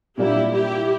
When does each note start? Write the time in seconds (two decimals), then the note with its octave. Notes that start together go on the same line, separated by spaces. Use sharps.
0.17 A#2 G3 A#3 D4 E4 G4
0.52 E4 G4